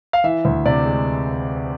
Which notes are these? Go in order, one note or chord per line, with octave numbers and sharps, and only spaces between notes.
F5
E3 E5
D2
C3 D5
G#3